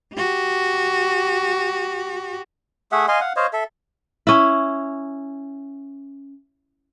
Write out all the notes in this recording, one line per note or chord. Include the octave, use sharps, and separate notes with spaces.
F#4 G4
A3 G#4 E5 F#5
D#5 F5 G#5 C6
F5 F#5
C5 C#5 D#5 F5
A4 E5
C#4 E4